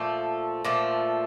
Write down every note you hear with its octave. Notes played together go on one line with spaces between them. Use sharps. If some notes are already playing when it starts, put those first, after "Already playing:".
Already playing: A#2 F3 A3
A#2 F3 A3